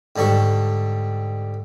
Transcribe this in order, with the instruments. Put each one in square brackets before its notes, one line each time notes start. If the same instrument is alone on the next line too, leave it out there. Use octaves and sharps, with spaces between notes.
[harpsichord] G#2 D3 G3 A4 C#6